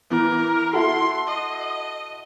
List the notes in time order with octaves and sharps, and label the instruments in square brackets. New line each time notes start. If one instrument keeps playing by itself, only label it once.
[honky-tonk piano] E3 B3 [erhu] A#4
[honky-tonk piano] E4 F#4 A4 [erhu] C6
[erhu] D#5